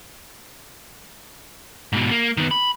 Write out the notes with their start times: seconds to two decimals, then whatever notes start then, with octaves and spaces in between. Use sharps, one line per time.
1.93 G#2 B2
2.11 A#3
2.37 D#3 B3
2.51 B5